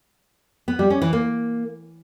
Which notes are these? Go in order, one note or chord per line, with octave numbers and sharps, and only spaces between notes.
B3
G3
C#4
E3
A#3